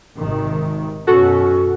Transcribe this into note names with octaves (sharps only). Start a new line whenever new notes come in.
G#1 C3 D#3
F#2 B2 C#4 F#4 A4